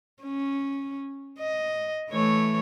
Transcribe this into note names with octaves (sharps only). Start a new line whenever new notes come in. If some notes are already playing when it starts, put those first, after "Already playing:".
C#4
D#5
E3 A3 C#5